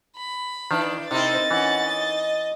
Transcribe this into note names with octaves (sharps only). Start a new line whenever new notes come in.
B5
D#3 E3 D4
C3 C4 D#4 E4 A#4 A6
E3 C#4 F#5
D#5